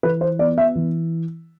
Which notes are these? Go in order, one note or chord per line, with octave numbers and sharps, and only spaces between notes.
E3 B4
C5
B3 D5
E5
E3